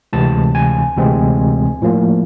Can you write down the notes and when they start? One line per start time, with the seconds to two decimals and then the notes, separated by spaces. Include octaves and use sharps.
0.13 D2 C3 E3 G#3 C4 A5
0.55 G#5
0.97 D2 C3 E3 G#3 C4
1.82 A2 F3 A#3